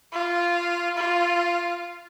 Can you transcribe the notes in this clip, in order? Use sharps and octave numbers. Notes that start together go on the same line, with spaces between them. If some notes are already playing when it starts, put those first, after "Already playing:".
F4
F4